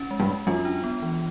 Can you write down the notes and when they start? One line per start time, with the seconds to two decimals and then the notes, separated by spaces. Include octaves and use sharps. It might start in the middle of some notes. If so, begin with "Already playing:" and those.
Already playing: C#4
0.11 G#3
0.20 G2
0.29 G#3
0.47 F#2 F4
0.65 D4
0.84 B3
1.02 E3